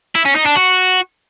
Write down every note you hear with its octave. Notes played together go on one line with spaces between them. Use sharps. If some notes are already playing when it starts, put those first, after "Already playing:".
E4
C#4
D#4
D4
F#4